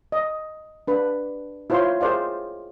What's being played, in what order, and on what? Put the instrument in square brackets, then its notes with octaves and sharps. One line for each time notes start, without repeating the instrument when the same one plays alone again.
[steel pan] D#5
D4 B4
E4 F4 C5 C#5 F5 C6
G#4 A#4 C5 D5 F5